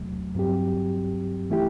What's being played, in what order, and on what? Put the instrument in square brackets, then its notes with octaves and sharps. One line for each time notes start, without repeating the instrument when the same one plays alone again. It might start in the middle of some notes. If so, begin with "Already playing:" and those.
Already playing: [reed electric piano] E2 C3 F#3 A3
G2 F#3 C4 G4
E3 A3 E4 G4